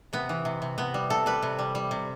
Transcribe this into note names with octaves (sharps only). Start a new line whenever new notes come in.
C3 B3
E3
C3
C3
C3 B3
G3
C3 A4
G3 B4
C3
G3
G3
C3